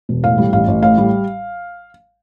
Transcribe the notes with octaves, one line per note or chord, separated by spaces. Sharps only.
E1
A2 F5
G3
A1 F5
A1
A2 F5
G3